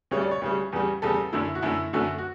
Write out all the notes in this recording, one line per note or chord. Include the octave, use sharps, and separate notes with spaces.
D2 C#3 G3 C#5
D5
C#5
D2 C#3 G3
E2 C#3 G3
E2 C#3 G3 A4
F#2 D3 A3 E4
F#4
F#2 D3 A3 E4
F#2 D3 A3 F#4
F#4